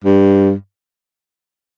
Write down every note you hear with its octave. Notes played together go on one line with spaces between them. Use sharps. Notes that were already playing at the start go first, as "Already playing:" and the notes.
G2